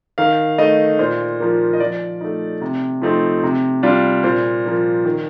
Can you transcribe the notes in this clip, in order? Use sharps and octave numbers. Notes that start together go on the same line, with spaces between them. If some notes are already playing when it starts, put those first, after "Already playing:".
D#3 F5
A3 D#4 D#5
A#2 C5
F3 A#3
D#5
F3 D5
A3 D#4
C3
F3 A3 C4 D#4
C3
G3 D4 F4
A#2 C5
F3 A#3
D#3